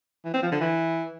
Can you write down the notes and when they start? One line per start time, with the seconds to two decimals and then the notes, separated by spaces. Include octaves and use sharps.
0.25 E3
0.34 C4
0.43 F3
0.52 D3
0.61 E3